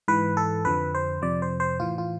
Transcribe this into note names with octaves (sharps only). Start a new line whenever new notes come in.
G#2 E3 B4
A4
F2 D3 F3 B4
C5
F2 C3 F3 D5
C5
C5
A2 E3 F4
F4